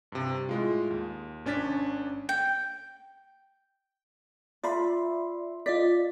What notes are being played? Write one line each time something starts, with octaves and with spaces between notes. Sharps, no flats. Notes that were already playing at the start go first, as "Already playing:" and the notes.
G2 C3
A2 G#3 F4
D#2
G#1 C#4 D4 A6 B6
G5
F4 D5 E5 B5 C6
F4 D5 D#5 B6